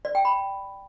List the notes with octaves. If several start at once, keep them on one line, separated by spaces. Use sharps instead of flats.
D5
G5
B5